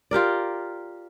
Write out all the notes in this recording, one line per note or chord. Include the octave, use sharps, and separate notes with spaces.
F4 G4 A#4 D5